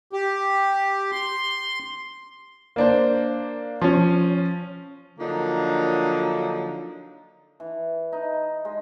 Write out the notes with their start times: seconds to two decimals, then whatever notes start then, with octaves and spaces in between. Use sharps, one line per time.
0.13 G4
1.11 C6
2.76 A#3 D4 C5
3.82 F3 C#4
5.19 D3 F3 F#3 A#3 D4 D#4
7.60 E3
8.12 D#4
8.65 G#3